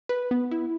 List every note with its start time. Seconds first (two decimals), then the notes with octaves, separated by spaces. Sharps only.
0.09 B4
0.31 B3
0.51 E4